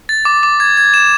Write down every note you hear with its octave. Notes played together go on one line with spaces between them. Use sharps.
A6
D6
D6
G#6
G#6
E7